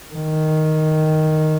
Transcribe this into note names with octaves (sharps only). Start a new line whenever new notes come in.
D#3